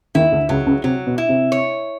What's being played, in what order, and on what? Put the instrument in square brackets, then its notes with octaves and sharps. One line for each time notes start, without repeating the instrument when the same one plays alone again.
[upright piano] D#2 D#3 [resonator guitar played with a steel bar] E4
[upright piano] D2 D3
[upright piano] C#2 C#3 [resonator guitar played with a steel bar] F#3
[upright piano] C#2 C#3
[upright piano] C3 [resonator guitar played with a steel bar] F#3
[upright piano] B2
[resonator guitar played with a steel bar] E4
[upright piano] C3
[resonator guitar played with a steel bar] C#5